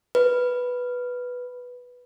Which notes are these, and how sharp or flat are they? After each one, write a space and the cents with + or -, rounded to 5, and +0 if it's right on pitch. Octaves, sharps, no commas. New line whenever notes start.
B4 -5